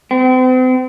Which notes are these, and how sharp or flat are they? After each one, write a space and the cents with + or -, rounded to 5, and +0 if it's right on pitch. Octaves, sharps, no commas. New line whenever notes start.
C4 -40